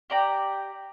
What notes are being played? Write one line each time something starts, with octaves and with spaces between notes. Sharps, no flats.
G4 D5 A#5